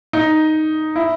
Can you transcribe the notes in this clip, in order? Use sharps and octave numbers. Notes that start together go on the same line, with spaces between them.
D#4
E4